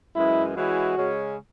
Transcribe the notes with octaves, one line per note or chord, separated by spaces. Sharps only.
F#2 E3 G#3 E4
E3 G#3 C#4 E4 F#4 G#4
C#3 G#3 C#4